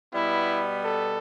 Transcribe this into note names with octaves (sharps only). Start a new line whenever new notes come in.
B2 G3 B3 E4
A4